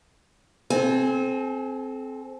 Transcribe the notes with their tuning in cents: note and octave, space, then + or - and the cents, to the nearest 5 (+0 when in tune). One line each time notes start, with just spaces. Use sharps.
C4 +0 A4 -40 G#5 +0